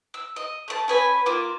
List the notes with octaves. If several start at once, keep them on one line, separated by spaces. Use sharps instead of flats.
E6
D#5
A3 A5
C#4 B4 G#5
A#3 F4 D6